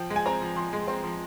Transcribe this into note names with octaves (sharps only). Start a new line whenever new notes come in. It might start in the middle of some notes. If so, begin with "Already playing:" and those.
Already playing: F3 G5
G#3
G#5
C4 A#5
F3
F3 C6
G#3
C4 C6
F3